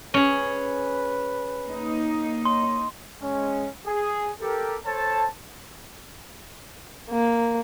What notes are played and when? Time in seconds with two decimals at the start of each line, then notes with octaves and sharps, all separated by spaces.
0.14 C#4 G#4 B4
1.66 A#3 D#4
2.45 C#5 C6
3.22 G#3 C#4
3.87 G#4
4.41 G4 A4 A#4
4.86 A4 C5 C#5 A5
7.10 A#3